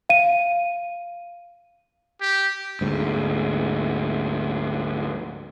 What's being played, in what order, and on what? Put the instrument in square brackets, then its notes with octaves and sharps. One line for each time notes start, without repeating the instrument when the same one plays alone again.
[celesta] F5 D#7
[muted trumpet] G4
[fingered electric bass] D2 G#2